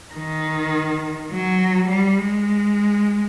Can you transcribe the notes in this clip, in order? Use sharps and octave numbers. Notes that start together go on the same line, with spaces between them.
D#3
F#3
G3
G#3